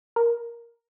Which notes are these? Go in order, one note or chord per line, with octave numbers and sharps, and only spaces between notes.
A#4